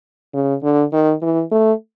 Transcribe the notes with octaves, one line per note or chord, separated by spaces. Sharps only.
C#3
D3
D#3
E3
A3